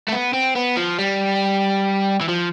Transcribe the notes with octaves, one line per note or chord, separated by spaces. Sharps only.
A3
B3
C4
B3
F3
G3
E3
F3